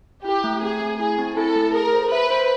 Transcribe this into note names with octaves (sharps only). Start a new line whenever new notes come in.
E4 G4
A3
C4 G#4
A3
E4 G#4
C4
E4 A4
A3
G#4 A#4
C5
B4 E5
C5